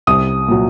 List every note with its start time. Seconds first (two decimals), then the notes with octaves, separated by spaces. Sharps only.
0.07 C2 D#6
0.48 A#2 F#3